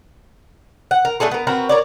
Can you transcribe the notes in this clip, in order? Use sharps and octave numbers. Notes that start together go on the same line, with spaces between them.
F#5
A#4
A3 D4 G#4 A4
B3 A#4
C4 F#4 A#4 B4
A#4 C#5 D5